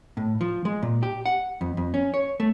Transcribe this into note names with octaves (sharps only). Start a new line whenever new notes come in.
A2
F3
G#3
A#2
G4
F#5
F2
F2
C#4
C#5
A3